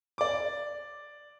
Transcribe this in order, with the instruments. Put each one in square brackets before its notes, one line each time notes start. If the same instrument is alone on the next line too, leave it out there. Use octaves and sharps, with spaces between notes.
[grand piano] D5 D6